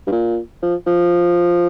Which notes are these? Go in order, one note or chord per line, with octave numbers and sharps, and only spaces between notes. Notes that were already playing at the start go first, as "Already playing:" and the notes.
G2
A#2
F3
F3